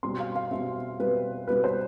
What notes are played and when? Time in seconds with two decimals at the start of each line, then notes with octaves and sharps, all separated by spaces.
0.03 B2 G3 C4 C6
0.20 F5
0.35 F5
0.51 B2 G3 C4 E5
0.99 B2 G3 C4 B4
1.47 B2 G3 C4 B4
1.64 C5